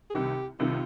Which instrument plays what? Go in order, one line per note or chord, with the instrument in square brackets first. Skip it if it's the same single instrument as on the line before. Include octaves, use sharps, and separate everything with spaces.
[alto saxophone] G#4
[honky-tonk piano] C2 C3 D#3 [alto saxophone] G4
[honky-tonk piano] C2 C3 D#3 [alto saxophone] F4